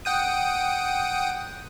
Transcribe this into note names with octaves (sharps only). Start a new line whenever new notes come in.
F#5 G5 D#6